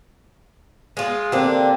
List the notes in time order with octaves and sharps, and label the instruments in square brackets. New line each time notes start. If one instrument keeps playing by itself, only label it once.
[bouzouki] G#3 F4
[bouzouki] D3 D4 [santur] A#3 C4 G4